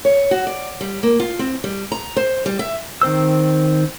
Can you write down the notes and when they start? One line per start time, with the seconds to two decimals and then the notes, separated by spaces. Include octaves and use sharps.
0.05 C#5
0.31 F#4
0.47 D5
0.81 G3
1.03 A#3
1.20 F4
1.39 C4
1.64 G3
1.92 A#5
2.16 C5
2.46 G3
2.59 E5
3.02 D#3 C4 C5 E6